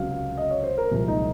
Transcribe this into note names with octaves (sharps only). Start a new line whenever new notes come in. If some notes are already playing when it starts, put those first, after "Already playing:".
Already playing: C#2 C3 F#3 F5
D#5
C#5
C5
A#4
C2 A#2 F3 G#3
D#4